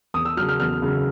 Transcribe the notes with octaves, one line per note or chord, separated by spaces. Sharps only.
E2 D#6
E6
C#3 F#3 F6
F6
E2 F6
C#3 F#3